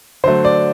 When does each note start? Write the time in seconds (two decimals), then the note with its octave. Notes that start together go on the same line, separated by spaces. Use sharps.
0.24 D3 F#3 A3 C5
0.45 D5